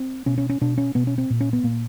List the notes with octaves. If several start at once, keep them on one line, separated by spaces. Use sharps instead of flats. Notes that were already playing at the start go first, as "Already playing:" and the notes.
Already playing: C4
B2 C#4
C#4
C#4
B2 D4
C#4
B2 B3
C#4
C4
A#2
C#4
B3
A#2 A#3